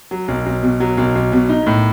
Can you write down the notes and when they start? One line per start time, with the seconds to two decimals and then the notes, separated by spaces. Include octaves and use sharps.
0.11 F#3
0.28 B1
0.46 B1
0.63 B2
0.80 F#3
0.98 B1
1.15 B1
1.32 B2
1.49 D#4
1.66 A2